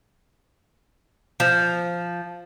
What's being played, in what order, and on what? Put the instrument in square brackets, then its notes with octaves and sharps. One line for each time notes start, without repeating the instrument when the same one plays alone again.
[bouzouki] F3